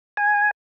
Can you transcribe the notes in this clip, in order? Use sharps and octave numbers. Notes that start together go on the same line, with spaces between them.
G#5